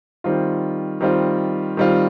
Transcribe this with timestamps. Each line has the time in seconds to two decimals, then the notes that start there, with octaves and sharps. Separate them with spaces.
0.24 D#3 G3 C4 F4
1.01 D#3 G3 C4 F4
1.77 D#3 G3 C4 F4